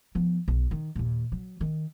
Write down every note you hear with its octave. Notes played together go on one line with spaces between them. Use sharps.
F3 B3
B1
D#3
D#2 A#2
F#3
D#3